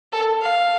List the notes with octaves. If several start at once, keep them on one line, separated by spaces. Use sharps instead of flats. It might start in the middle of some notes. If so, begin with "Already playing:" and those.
A4
F5